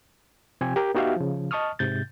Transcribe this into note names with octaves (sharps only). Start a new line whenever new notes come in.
C3 F3 C4 G4 G#5
G4 A#4
B3 D#4 F#4 G4 E5 F5
C#3 F3
D#5 A5 C#6 D#6 F6
G#2 C3 G6 A6